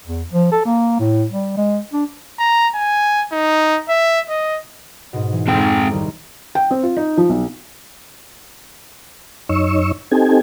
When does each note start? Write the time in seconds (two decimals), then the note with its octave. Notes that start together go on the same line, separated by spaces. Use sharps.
0.06 E2
0.31 F3
0.51 A4
0.65 A#3
0.99 A2
1.30 G3
1.57 G#3
1.92 D4
2.39 A#5
2.75 G#5
3.32 D#4
3.89 E5
4.29 D#5
5.13 G#2 B2
5.33 E3
5.48 F2 G#3 C4 G5 F6
5.63 A#5 C#6 D6
5.91 C2 D#3 G3
6.55 G5
6.71 C4
6.83 F4
6.97 D#4
7.17 F3
7.30 B1
9.49 F#2 D#4 C#5 C#6 E6
10.11 C4 D#4 G4 A4 G#5